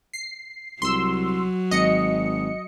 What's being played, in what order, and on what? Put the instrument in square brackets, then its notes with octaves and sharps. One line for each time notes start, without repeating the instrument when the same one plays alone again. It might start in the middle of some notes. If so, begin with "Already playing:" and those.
[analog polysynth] C7
[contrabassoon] C2 [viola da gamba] F#3 [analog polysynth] C6 E6
[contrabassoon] G#1 [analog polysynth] D#5 C#7